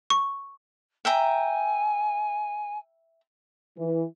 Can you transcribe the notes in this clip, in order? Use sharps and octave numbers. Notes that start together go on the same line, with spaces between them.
C#6
E5 G5 G#5 A#5
E3